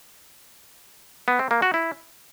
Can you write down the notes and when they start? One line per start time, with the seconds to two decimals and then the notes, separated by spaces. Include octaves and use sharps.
1.28 B3
1.39 C4
1.51 A#3
1.62 F#4
1.74 E4